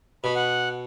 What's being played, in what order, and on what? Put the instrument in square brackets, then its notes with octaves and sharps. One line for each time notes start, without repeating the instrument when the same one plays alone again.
[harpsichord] B2 [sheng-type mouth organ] B5
[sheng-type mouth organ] F#5